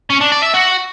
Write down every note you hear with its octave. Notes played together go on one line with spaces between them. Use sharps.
C#4
D4
D5
E5
F#4